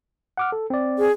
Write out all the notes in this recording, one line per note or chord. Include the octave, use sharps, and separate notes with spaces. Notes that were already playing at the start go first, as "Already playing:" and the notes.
F#5 D6 F6
A4
C4 D5
G#4